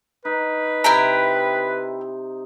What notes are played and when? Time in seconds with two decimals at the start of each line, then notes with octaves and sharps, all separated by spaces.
0.25 D#4 B4
0.84 C3 E4 G5 A#5